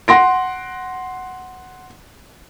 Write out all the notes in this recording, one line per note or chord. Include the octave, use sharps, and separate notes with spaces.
F#5 C6 A#6 D7